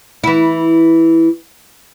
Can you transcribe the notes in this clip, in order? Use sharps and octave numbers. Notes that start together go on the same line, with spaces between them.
E3 E4